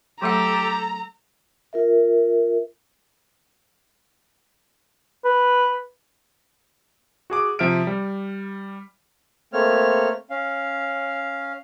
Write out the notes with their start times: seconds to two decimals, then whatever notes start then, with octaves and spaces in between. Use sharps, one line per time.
0.22 F#3 A3 G4 A4 F#5 A#5
1.73 F4 A#4 E5
5.24 B4
7.30 F#4 G#4 D6
7.59 C3 F3 E5 F6 D7
7.87 G3
9.53 A3 A#3 C4 C#5 F6
10.30 C#4 F5